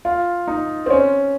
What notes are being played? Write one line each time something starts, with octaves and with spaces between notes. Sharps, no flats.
F4
D#4
C4
C#4